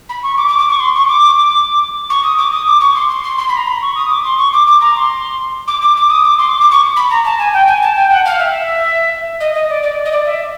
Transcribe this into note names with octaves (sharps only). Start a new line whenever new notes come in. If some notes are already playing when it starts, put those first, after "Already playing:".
B5
C#6
D6
D6
D6
C#6
C6
C#6
D6
C#6
D#6
D6
D#6
D6
C#6
C6
C6
C6
C6
B5
A#5
B5
C#6
D#6
D6
C6
C#6
D6
D6
A#5
C6
D6
D6
D6
D#6
D6
C6
D6
D6
C#6
B5
A#5
A5
G#5
G5
G#5
A5
G5
F#5
F5
E5
D#5
D#5
D5
D5
D#5
D5
E5